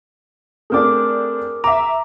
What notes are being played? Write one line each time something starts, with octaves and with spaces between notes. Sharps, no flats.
A3 C4 D4 G#4 A#4 D6
E5 A#5 D6